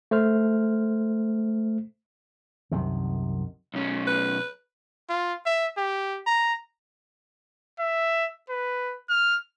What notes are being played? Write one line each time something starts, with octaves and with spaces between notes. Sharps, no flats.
A3 C5 F6
C2 F#2 C3 D#3
B1 C#4
B4
F4
E5
G4
A#5
E5
B4
F6